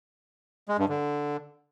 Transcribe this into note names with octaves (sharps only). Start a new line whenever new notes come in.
G#3
G2
D3